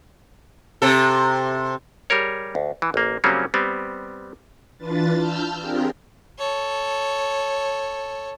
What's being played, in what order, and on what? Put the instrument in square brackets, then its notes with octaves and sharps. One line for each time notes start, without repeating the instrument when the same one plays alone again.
[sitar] C3 A4
[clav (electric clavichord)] G3 G#4 A#4 C#5
D2
E3
A1 A#3
C#3 F#3 G3 A#3 C4 C#4
G3 B3 C4
[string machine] E3 D4 F4 B4 A6
A5 E6 F6 G6
C4 D4 F4 G4 G#4 A#4
[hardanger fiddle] A4 C#5